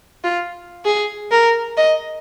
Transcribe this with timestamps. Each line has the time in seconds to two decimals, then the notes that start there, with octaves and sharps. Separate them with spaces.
0.24 F4
0.85 G#4
1.31 A#4
1.77 D#5